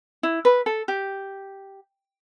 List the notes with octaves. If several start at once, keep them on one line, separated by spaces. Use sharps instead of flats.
E4
B4
A4
G4